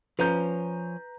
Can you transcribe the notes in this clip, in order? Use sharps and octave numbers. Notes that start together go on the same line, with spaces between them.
F3 C#4 B4 A#5 G6